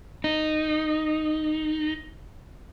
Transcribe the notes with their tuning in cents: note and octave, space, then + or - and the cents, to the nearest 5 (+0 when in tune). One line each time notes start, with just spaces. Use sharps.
D#4 -10